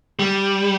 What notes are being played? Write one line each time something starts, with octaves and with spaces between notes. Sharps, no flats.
G3